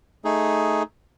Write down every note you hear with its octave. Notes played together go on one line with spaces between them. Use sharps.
A3 D#4 G#4